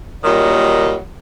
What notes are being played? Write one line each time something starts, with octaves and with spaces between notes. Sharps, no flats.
A#2 D#3 F#3 G3